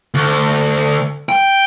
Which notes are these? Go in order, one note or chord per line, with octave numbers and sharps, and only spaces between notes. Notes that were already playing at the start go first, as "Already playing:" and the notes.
D2
G5